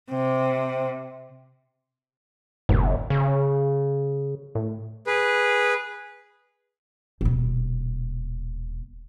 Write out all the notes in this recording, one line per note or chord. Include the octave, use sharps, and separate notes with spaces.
C3 C4
F#1 D#2 G#2 B2
C#3
A2
G#4 B4
D#1 B2